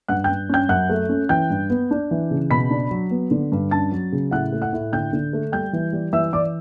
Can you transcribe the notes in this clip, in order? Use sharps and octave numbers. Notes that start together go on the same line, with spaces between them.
G2 F#5 F#6
G5 G6
G2
C#4 G5 G6
F#2 F#5 F#6
A3
C#4
E3 G5 G6
G2
B3
D4
E3
C#3
B2 B5 B6
D4
F#3
B3
D3
G2
C#4 A5 A6
F#3
C#3
A2 F#5 F#6
A3
F#5 F#6
A2
D3 G5 G6
D3
A3
G3 G5 G6
E3
G3
E3 E5 E6
E3 D5 D6